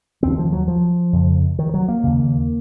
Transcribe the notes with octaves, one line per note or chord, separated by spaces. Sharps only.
D#2 C#3 C4
F3
F#3
F3
F2 C#3
D#3
F#3
A#3
D#2 C#3